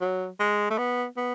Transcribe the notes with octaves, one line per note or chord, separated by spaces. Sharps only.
F#3
G#3
A3
B3
B3